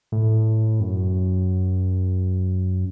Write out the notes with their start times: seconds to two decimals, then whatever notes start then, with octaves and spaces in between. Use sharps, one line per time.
0.12 A2
0.80 F#2